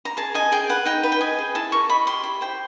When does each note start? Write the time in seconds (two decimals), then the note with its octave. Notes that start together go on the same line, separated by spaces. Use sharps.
0.05 A#5
0.17 G#4 A5
0.34 D#5 G#5
0.52 G#4 G5
0.69 B4 F#5
0.85 D#4 G5
1.03 B4
1.12 G5
1.21 D#5 G#5
1.38 G#4
1.55 E4 A5
1.72 A#4 C#6
1.89 D#5 B5
2.07 G4 C6
2.24 E4 B5
2.41 C5 G5